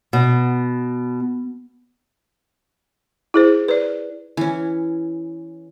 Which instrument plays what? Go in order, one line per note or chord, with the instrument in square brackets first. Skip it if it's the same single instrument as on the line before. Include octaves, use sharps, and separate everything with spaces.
[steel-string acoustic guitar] B2
[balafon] E4 G#4 C5
B4 D5
[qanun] E3 C#4